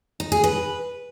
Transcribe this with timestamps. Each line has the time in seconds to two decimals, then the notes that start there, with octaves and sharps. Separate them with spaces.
0.20 D#4
0.32 G#4
0.44 B4